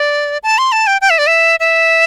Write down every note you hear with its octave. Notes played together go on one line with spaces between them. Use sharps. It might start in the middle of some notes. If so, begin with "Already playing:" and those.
Already playing: D5
A5
C6
A5
G5
G5
E5
D5
E5
E5